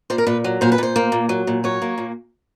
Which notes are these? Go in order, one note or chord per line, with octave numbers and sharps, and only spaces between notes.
A#2 C5
A#4
A#2 B4
F#3
A#2 C5
B4
A#2 C5
A#3
A#2
F#3
A#2
F#3 C#5
A#3
A#2